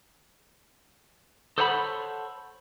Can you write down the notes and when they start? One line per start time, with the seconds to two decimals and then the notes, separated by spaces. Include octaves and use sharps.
1.58 A4 C5 C#5 F#5 A5 B5